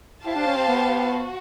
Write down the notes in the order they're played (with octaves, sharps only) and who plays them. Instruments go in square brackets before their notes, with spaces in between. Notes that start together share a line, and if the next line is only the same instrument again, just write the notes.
[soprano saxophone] E4 [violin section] G4 C5 F5 A5
[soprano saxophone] D4
C#4
C4
B3
[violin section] F#4